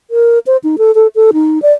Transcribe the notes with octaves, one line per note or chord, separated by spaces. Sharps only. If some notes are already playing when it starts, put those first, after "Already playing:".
A#4
C5
D#4
A4
A4
A4
D#4
D5